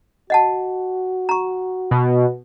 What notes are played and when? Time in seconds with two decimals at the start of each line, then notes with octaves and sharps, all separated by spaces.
0.30 F#4 D#5 F#5 A5
1.29 A#5 C#6
1.91 B2